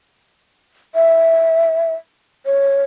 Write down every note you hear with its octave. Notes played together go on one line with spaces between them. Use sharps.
E5
C#5